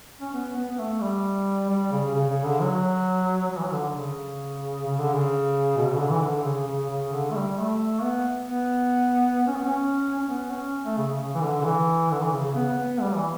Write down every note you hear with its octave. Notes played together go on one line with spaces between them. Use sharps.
C#4
B3
B3
B3
A3
G3
G3
C#3
C#3
C#3
D3
F#3
F#3
E3
F#3
D3
C#3
C#3
D3
C#3
B2
C#3
D3
E3
D3
C#3
C#3
C#3
D3
A3
G3
A3
B3
B3
C#4
B3
C#4
C#4
B3
C#4
A3
C#3
C#3
E3
D3
D3
E3
D3
E3
C#3
C#3
B3
B3
G3
E3